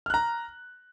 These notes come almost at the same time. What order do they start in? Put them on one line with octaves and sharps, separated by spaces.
F6 F#6 A#5